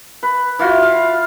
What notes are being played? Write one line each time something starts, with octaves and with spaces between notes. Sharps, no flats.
B4
E3 F4 F#4
F5